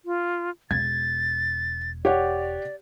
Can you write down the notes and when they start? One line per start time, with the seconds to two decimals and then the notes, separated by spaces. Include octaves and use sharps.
0.05 F4
0.71 E1 G#6 A6
2.05 G4 C#5 D5 F#5